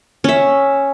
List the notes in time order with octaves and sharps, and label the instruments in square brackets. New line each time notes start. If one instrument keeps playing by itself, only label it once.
[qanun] C#4 E5